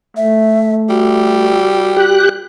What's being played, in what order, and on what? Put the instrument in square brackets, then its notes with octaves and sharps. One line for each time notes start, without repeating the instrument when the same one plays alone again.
[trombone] A3 [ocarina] E5
[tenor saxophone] G3 [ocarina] F#4
[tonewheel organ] G4 F#6